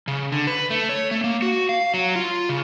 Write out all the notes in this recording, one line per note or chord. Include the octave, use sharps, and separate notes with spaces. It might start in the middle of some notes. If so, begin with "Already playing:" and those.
C#3
D3
B4
A3
C#5
A3
A#3
F#4
F5
F#3
F4
C#3